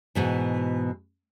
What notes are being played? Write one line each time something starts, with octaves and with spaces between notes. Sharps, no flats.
G#2 B2 E3